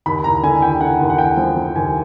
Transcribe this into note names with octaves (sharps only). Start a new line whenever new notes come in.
D#2 B5
D#2 A#5
D3 G#5
D#2 G5
D3 F#5
D#2 F#5
F#5
D#2 G5
F3
F3
D#2 G#5